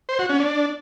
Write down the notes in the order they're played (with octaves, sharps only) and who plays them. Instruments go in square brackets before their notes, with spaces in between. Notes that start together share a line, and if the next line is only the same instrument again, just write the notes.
[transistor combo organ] C5
F#4
C#4
D4